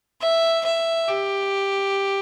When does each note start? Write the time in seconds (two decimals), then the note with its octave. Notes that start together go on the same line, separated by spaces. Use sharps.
0.21 E5
0.65 E5
1.08 G4